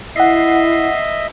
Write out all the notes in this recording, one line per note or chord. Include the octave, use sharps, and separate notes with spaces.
E4 D#5 E5 F#5 C7